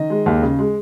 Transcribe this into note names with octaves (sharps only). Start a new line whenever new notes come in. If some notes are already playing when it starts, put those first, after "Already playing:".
Already playing: D#3 D#5
G#3
D#2
C#3
G#3